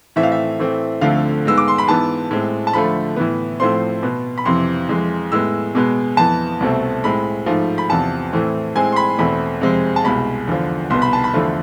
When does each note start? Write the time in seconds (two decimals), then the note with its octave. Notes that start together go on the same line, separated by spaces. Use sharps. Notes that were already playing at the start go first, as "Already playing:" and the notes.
0.16 A2 E3 A3 C4 E5
0.23 F5
0.32 E5
0.59 A2 E3 A3 C4
1.01 D2 D3 F3 A3 C4 F5
1.45 G#2 G#3 B3 E6
1.58 D6
1.68 C6
1.78 B5
1.87 G#2 E3 B3 A5
2.31 A2 G#3 C4
2.67 A5
2.73 D2 D3 F3 A3 B5
3.16 A2 E3 B3
3.60 A2 F3 A3 C4 C6
4.03 B2 B3
4.38 B5
4.45 F2 C3 E3 C6
4.89 F2 E3 G#3
5.32 A2 G#3 B3 E6
5.75 B2 G#3 B3
6.17 F2 E3 B3 A5
6.60 C2 B2 A3 C4
7.04 A2 G#3 C4 B5
7.46 G#2 F3 A3
7.78 B5
7.89 E2 C3 F3 A5
8.33 A2 E3 A3 C4
8.75 A2 G#3 C4 G#5
8.92 C6
8.96 B5
9.18 E2 B2 A3 C4 B5
9.61 F2 C3 G#3 C4
9.96 A5
10.04 C2 B2 G#3 B5
10.47 E2 D3 F3
10.90 C2 B2 B3 C6
11.02 B5
11.13 A5
11.24 B5
11.34 E2 D3 F3 A3